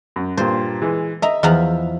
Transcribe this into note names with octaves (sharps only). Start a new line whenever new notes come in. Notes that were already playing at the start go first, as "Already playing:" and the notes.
F#2
G2 A#2 C5
E3 G#3
D#5 E5 A#5
E2 F3 A#5